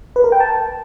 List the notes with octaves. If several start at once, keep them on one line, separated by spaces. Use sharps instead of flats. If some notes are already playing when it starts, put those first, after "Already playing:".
B4
A#4
G5
A5